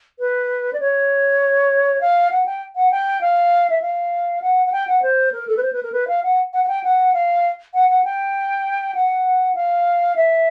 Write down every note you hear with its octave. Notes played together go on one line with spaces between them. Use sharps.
B4
D5
C#5
F5
F#5
G5
F#5
G5
F5
E5
F5
F#5
F#5
G5
F#5
C5
A#4
A4
B4
C5
B4
A#4
B4
F5
F#5
F#5
F#5
G5
F#5
F5
F#5
F#5
G5
F#5
F5
E5